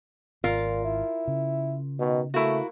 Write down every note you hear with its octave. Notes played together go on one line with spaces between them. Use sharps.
G#1 A#2 F4 A#4 F5
E4
C#3
B2 D#3
A3 A#3 E4 F#4